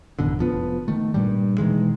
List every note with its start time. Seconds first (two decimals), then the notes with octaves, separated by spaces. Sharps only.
0.19 A1 F#2 B2 D3
0.39 F1 F3 B3
0.88 D#3 A3
1.14 G2 A#2 G3
1.58 B2 D#3 E3 G#3